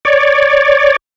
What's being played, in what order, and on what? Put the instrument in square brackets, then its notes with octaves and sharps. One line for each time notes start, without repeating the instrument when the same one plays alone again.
[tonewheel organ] C#5 D5